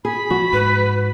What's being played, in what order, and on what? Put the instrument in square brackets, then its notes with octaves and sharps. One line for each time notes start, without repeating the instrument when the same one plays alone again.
[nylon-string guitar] G#4 [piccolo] B5
[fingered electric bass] F3 [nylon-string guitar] F#4
[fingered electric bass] G#2 [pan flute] B4